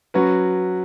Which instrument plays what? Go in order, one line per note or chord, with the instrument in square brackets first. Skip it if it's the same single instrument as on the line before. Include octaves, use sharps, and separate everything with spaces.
[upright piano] F#3 C#4 F#4 B4